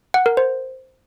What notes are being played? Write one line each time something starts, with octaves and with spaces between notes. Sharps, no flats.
F#5
A#4
C5